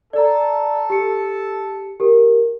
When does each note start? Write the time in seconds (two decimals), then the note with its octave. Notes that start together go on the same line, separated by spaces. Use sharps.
0.13 A4 D5 A#5
0.90 G4 C#7
2.00 G4 A#4